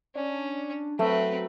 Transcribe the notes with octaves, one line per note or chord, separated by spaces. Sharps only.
C#4 D4
F#3 A3 C4 B4